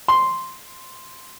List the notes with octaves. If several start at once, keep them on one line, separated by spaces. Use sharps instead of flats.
C6